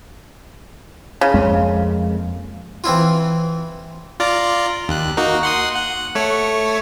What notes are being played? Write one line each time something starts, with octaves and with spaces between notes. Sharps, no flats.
C#3
F2 G#3 A#3
E3 C4 E4 F4
F4 D5 A#5
D#2 F#6
A#3 D#4 F#4
F#5 C6 D#6
F#5
A3 C#5